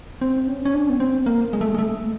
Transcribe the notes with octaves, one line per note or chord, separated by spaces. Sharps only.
C4
C#4
C#4
D4
B3
C4
A#3
G#3
A3
G#3
A3